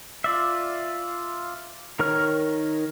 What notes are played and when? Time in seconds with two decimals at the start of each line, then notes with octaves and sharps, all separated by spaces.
0.24 F4 D5 E5
1.99 D#3 A#4 C#5 F6